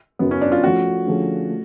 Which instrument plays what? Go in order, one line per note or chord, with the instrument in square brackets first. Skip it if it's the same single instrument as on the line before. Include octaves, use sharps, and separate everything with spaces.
[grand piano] F#2 C#3 F#3 [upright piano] B3
[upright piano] C#4
D4
F4
[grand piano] F3 A3 C#4 [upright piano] F#4
[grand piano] D3 F3 A3 C#4 G#4
A3